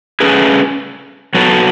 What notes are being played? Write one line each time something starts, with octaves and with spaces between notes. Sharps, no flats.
A3 C#4 G#4 B4
F#3 B3 F#4 A4